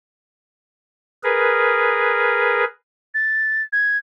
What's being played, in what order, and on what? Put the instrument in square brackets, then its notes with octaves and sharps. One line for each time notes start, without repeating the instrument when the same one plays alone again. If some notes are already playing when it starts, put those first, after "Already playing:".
[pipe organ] G#4 A#4 B4
[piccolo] A6
G#6